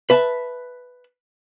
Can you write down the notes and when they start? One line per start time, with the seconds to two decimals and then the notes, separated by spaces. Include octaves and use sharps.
0.10 B4 E5 A5